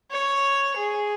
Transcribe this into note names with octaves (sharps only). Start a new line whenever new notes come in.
C#5
G#4